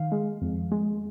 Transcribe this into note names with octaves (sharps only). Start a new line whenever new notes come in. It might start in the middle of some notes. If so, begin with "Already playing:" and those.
Already playing: D#3 F5
G#3
F2
G#3